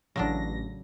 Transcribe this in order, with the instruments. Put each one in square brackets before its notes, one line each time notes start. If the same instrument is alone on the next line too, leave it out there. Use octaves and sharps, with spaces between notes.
[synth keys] A1 A#6 [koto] C#3 F#3 D4